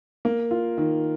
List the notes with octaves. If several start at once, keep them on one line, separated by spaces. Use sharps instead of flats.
A#3
F4
D#3